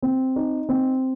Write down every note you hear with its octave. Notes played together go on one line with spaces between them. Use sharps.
C4
D#4
C4